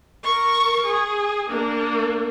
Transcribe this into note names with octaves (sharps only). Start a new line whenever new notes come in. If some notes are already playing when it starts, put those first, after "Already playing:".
A#4 C#6
G#4
A#3 D4